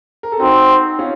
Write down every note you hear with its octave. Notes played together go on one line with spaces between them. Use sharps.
A#4
A4
C4 D#4 F#4
C#4 F4